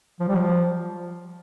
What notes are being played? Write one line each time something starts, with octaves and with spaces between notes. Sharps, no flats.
F3
G3
F3